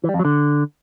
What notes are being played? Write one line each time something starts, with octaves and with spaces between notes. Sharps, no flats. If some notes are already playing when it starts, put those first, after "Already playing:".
E3
G3
F2
F#3
D3